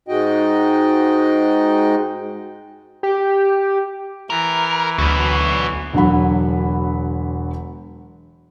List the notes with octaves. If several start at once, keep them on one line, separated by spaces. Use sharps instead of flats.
G#2 G#3 D#4 F#4 D#5 G5
G4
E3 A#4
D2 F#3 B3
E1 D3 F#3 F#5 B5